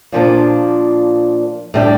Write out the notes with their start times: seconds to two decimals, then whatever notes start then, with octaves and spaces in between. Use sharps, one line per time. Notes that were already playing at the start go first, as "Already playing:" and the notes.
0.12 A#2 F3 A#3 D4
1.74 A2 G3 D4 G4